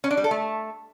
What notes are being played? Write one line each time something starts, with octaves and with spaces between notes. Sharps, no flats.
C#4
D4
G3
A4
A3